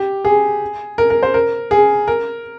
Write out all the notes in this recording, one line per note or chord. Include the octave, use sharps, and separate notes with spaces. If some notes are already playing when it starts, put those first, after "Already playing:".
Already playing: G4
G#4
A#4
A#4
C5
A#4
G#4
A#4